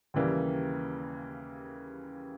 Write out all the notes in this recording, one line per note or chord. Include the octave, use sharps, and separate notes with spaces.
D#2 C#3 E3 G3 A#3